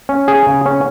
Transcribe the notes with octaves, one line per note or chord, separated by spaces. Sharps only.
C#4
G#4
C#3
C#4